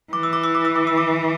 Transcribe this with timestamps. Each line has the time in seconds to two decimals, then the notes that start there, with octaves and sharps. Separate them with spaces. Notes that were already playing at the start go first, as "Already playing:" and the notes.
0.13 E3 D6
0.23 E6
0.33 D6
0.44 E6
0.55 D6
0.65 E6
0.76 D6
0.87 E6
0.98 D6